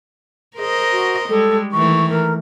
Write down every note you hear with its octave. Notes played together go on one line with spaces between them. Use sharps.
G#4 A#4 C5 D#5
F#4
G3 G#3 A4
D#3 E3 A3 C#6
A#4